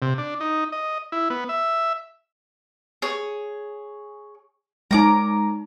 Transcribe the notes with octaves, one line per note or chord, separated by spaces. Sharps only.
C3
D4
D#4
D#5
E4
B3
E5
G#4 C#5
G#3 D#4 A#4 D6